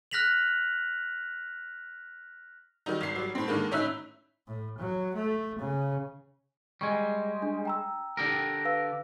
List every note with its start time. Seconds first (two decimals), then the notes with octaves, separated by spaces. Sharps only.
0.11 F6 F#6 A#6 B6 F7 F#7
2.86 D#3 F#3 G3 D#4
3.01 G#1 C7
3.16 F#3 G3
3.35 A2 C4
3.48 D3 D#3 G#3 A#3
3.71 A2 C#4 D#4 E5 E6 F#6
4.47 A2
4.78 F#3
5.15 A3
5.59 C#3
6.81 G3 G#3 C#6 G#6
7.42 D4
7.65 G5 A#5 E6
8.17 D3 G4 A#4
8.65 B4 F5 E6